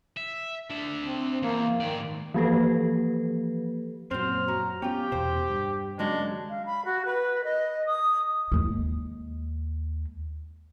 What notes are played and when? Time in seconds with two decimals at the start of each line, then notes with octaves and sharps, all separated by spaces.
0.17 E5
0.70 D4 E5
1.03 C4
1.42 E2 A#3
1.80 G#2 D#3 D5
2.34 E3 F3 A#3 G4 A4 B4
4.11 F#2 A#2 F#3 C4 C5 F6
4.48 F#3 A#5
4.82 B3 C#4 F4 G4 G5
5.12 E2 B2 C5
5.50 G2
5.99 D#2 C#3 F#3 G#3 D4
6.49 F5
6.65 B5
6.85 F#4
7.05 B4
7.44 D#5
7.86 D#6
8.52 D#2 G#3